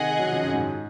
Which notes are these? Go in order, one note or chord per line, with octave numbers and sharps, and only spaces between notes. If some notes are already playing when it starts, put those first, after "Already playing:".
Already playing: C3 D#3 G#4 D#5 F#5
D#3 F#3
C#3 F3
F#2
G#2